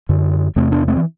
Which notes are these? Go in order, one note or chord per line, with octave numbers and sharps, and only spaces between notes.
F#2 D3
E2 C3 A3 C4
B3 D4
A3 C4
E3